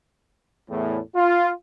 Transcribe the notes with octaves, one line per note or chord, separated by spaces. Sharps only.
E2 A2
F4